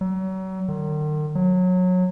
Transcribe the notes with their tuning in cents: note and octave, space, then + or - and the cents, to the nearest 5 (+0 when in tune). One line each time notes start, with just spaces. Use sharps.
F#3 +35
D#3 -45
F#3 -20